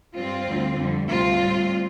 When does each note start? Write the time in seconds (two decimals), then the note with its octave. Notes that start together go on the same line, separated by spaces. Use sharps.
0.16 G2 G3 C4 F4
0.47 D2 D3 G3
0.78 F2 D3 G3
1.08 D2 C3 G3 C4 F4
1.39 A2 G3